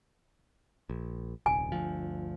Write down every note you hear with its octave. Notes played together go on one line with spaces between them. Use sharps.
A#1
D#1 C2 G#5
G1 D2 F3